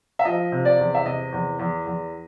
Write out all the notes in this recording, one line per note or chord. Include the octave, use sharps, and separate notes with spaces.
E5
F3 D#5
C3
D5
E2
E5
C3 D#5
E2
E2
E2